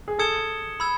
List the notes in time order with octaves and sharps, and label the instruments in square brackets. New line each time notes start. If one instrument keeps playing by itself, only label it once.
[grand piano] G#4
[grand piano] A4 [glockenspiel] D#6 G#6 C#7 E7 G7
[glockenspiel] B5 E6 G#6